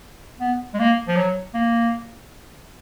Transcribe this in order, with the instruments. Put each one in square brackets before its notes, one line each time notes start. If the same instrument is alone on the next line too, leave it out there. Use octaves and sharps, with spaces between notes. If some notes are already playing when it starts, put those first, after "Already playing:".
[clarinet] B3
G#3
A#3
F3
F#3
A#3